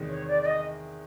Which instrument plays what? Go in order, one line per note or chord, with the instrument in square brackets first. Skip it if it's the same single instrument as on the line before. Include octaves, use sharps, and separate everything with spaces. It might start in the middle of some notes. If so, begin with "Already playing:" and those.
Already playing: [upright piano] E2 C3 D#3 G#3 B3
[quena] C#5
D5
D5
D#5